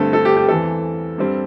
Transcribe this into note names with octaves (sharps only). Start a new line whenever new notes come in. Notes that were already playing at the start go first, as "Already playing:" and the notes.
Already playing: G2 D3 A3 C4 A4
A4
G4
G4
E2 E3 C4 A4
G2 G3 C4